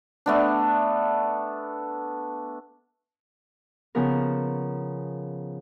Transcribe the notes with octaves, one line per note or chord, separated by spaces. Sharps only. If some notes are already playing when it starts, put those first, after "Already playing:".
A3 B3 D4
C#3 F3 B3 A#4